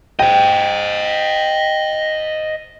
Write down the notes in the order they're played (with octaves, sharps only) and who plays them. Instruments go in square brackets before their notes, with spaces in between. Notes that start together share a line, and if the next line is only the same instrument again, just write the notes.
[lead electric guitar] C5 D#5 [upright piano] G5